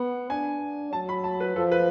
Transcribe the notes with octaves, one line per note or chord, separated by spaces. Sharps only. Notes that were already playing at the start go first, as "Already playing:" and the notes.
Already playing: B3 F#5
D4 G#5
F#3 A5
B5
A5
B4
F3 A4
B4